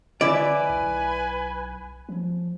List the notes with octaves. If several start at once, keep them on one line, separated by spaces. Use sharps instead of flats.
D3 E4 B4 D5 G#5
B1
F3